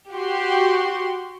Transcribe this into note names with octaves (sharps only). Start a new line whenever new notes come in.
F#4 G4 C6